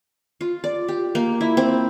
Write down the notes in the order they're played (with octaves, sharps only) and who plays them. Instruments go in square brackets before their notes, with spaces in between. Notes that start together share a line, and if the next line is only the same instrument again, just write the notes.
[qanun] F4
D5
G4
A#3
E4
C4